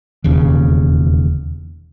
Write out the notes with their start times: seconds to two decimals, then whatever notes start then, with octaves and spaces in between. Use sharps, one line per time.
0.24 E1 D#2 C#3